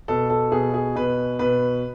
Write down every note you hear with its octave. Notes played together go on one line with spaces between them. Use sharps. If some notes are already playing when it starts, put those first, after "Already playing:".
B2 A4
A4
B2 G#4
G#4
B2 B4
B2 B4